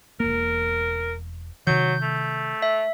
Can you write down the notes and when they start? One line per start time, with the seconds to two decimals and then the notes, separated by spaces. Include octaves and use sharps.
0.20 E1 A#3 A#4
1.67 C3 D#3 F#3 G6
2.02 A3
2.62 E5